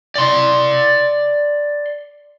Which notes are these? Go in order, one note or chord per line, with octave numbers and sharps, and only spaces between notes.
D5 C6